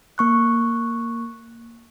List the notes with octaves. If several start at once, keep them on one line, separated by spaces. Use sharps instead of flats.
A#3 C#6 F#6